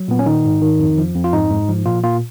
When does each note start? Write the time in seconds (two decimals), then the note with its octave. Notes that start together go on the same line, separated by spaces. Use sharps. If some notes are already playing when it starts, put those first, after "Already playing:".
Already playing: F#3
0.08 A#2 B3
0.19 C#4
0.26 D#3 D#4
0.45 G#2
0.62 D#3
0.79 F2
0.98 F3
1.15 F2
1.24 F4
1.33 G#2 D#4
1.51 G#2
1.69 F3
1.86 A#2 F4
2.04 A#2 F4